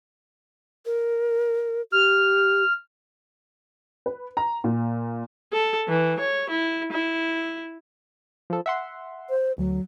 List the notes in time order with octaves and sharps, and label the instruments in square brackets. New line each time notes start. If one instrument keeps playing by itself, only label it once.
[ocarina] A#4
[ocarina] G4 [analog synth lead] F6
[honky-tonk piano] B4
A#5
A#2
[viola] A4
E3
C#5
E4
E4
[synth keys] F3 A4
E5 F#5 C6
[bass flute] C5
[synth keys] D2 [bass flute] F#3